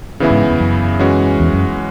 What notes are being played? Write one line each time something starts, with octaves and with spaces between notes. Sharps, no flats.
C#3 E3 B3 E4
G#2
E2
F#2
E3 G#3 C#4 F#4
E2
F#2